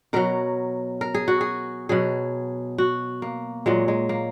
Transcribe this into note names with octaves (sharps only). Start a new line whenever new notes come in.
B2 F#3 A#4
A#4
G#4
F#4
G#4
B2 F#3 G#4
F#4
A#3
A#2 F#3 G#3
G#3
A#3